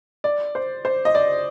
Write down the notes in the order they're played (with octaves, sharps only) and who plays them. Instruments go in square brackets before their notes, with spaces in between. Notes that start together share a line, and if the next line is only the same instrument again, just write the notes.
[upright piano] D5
C5
C5
D#5
D5